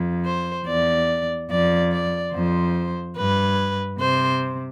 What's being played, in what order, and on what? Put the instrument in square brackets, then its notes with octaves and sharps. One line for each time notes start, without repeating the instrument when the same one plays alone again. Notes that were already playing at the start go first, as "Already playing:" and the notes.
Already playing: [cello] F2
[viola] C5
[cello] E2 [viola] D5
[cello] F2 [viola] D5
[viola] D5
[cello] F2 [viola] C5
[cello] G2 [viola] B4
[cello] C3 [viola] C5